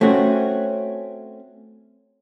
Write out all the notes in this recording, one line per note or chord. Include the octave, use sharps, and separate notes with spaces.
A3 C4 C#4 F#4